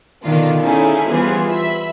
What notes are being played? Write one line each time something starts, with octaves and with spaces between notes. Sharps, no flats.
B2 D3 D#3 D4 F4
C#4 D#4 E4 G#4 A4
E3 G3 B3 F4 G#4 C5
E5 B5